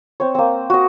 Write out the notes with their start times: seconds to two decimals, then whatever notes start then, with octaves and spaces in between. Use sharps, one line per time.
0.20 C4 C#5
0.35 A#3 C4
0.70 F#4 D#5